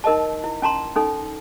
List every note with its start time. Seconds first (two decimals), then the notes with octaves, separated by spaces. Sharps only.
0.04 D#4 A#4 D#5 A5
0.44 E4
0.62 C#4 A5 A#5 C6
0.96 C#4 D#4 A4